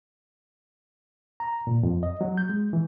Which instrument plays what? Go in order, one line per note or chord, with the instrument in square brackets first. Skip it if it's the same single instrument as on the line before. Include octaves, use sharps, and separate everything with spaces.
[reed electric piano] A#5
A#2
F2
D#5
F#3
G6
G#3
E3